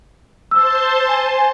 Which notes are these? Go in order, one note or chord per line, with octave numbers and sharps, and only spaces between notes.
C5 A5 C6 E6
G#5